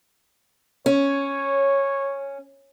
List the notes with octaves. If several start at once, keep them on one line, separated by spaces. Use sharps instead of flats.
C#4 C#5